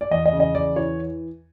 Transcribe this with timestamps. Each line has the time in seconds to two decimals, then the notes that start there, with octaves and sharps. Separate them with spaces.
0.01 D5
0.11 E2 D#5
0.26 D#5
0.33 C#3
0.40 D#5
0.54 E2 D5
0.76 E3 C#5